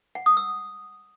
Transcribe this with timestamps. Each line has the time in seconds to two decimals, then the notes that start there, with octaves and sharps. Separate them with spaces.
0.15 F#5
0.26 D#6
0.37 E6